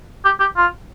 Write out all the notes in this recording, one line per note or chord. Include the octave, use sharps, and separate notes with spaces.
G4
G4
F4